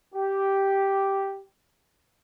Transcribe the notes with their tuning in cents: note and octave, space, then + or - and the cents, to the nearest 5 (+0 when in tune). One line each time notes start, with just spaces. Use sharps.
G4 -5